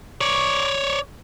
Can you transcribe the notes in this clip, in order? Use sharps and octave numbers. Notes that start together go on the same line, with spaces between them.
C#5 D5